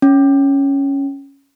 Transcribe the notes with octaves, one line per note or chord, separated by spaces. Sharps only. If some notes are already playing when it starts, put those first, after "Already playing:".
C#4